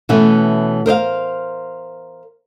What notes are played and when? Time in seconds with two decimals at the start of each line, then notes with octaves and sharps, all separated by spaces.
0.09 B2 E3 A3 C#4
0.86 A#4 C5 D#5 F5